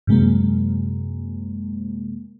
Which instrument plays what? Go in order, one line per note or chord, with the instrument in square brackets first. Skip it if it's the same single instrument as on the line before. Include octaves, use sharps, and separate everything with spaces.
[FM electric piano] F#2 C3 G#3 A#3